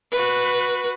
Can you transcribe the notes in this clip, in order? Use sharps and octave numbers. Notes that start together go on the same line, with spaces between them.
F#4 B4